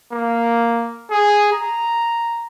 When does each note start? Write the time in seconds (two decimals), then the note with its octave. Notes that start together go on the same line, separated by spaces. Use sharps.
0.12 A#3
1.11 G#4
1.53 A#5